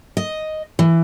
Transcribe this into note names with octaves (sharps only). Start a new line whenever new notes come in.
D#5
E3